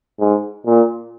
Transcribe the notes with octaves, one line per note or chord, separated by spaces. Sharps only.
G#2
A#2